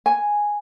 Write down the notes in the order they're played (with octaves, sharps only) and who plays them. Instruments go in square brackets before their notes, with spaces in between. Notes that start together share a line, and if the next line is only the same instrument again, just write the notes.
[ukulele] G#5